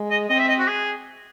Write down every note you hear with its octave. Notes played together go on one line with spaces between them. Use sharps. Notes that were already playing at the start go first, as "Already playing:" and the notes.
Already playing: G#3
D#5
C4 D#5
E5
D#5
F#4
G#4